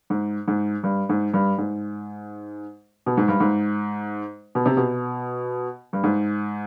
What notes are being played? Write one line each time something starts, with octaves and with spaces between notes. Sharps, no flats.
G#2
G#2
G2
G#2
G2
G#2
B2
G#2
G2
G#2
B2
C3
B2
G2
G#2